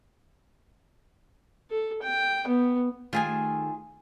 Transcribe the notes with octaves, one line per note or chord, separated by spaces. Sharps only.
A4
G5
B3
D#3 G3 A3 F4 G#4 G#5